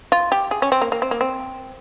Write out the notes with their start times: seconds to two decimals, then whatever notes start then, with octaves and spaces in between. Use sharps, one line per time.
0.12 F4
0.32 G4
0.51 G#4
0.62 C#4
0.72 C4
0.82 A#3
0.92 A#3
1.02 C4
1.11 A#3
1.21 C4